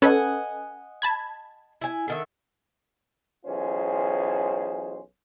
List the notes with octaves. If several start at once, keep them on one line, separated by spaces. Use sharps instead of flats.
C#4 A4 B4 D#5 F#5 G#5
A5 B5 G#6
E4 G#5
D3 D#3 E5
B1 E3 C#4 F4 G#4 C5